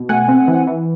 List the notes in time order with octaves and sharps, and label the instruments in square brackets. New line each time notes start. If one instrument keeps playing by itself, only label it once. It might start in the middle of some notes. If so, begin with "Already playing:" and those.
Already playing: [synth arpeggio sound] B2
A3 F#5 G#5
C4
E3
E3